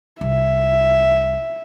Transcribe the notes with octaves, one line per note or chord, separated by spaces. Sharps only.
C2 E5